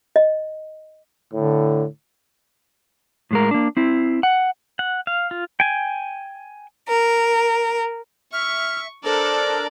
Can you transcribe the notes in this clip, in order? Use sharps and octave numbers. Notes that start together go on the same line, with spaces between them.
D#5
A2 D3
A2 G#3 A#4
A#3 D4
C4 E4
F#5
F#5
F5
F4
G5 G#5
A#4
E5 C#6 F6
D4 A4 A#4 C5 D5 A#5